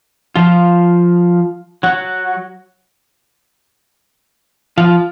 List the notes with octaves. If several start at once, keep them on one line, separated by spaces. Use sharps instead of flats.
F3 F4
F#3 F#4
F3 F4